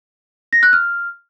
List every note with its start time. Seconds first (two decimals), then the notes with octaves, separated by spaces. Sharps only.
0.53 A#6
0.63 F#6
0.73 F6